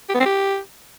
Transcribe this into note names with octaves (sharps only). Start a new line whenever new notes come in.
G4
B3
C4
G4